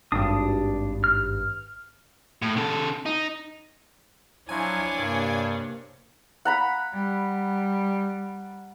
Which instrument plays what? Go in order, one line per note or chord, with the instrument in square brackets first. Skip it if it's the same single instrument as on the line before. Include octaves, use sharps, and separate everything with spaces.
[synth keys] G#1 G2 [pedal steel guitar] D4 D#6
[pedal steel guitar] F6
[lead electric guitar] A2
C#3 A4
D#4
[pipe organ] F3 F#3 [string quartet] D4 C#5 [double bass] E4 [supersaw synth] G#5
[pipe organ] G2 [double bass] C3 A#3
[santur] F#5 A#5 B5
[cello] G3